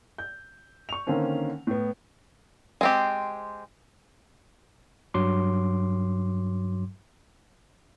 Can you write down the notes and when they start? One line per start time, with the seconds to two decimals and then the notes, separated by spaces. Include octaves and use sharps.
0.18 G6
0.89 C#6 F7
1.07 D3 D#3 A#3 C4 C#4
1.67 A2 B3
2.81 G#3 C4 G4
5.14 G2 F#3 C6 D6